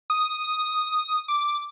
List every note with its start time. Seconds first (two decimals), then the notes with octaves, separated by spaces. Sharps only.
0.10 D#6
1.28 D6